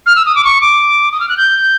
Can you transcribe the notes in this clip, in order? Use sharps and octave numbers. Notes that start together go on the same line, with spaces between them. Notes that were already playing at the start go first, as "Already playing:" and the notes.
F6
E6
D#6
D6
C#6
D6
D#6
F6
F#6
G6